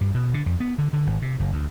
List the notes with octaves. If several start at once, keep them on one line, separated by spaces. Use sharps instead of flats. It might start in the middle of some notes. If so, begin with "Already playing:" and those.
G2
B2
D3
F2
B3
D3
D3
G#1
C3
F#1
D2